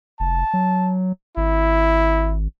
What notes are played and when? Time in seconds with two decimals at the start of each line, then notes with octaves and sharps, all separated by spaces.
0.20 F1 A5
0.54 F#3
1.37 G#1 E4